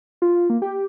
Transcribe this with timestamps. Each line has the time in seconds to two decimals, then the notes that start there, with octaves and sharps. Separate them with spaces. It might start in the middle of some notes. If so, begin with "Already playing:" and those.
0.22 F4
0.50 A#3
0.62 G4